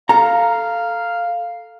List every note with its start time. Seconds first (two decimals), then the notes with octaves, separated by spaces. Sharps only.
0.09 A4 F5 A#5